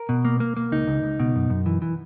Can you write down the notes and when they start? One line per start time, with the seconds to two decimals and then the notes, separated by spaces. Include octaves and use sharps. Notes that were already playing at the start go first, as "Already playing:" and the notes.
Already playing: A#4
0.09 B2
0.25 A#3
0.40 A#3
0.57 A#3
0.72 C#2 D#4
0.87 C#2
1.03 C#2
1.20 B2
1.35 F#2
1.50 F#2
1.66 E3
1.82 E3